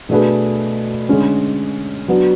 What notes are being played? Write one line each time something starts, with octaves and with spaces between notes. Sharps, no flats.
B2 A3 D4 G#4 B4
D3 G#3 C#4
F#3 B3 D4 F#4